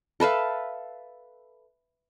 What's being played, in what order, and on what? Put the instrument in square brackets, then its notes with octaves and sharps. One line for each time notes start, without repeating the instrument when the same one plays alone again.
[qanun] A4 B4 E5 F5